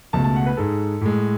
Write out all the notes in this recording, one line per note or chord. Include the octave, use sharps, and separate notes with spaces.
C#2 B2 A3 A5
A5
F#5
B4
G#2 G#3 A4
A2 G#3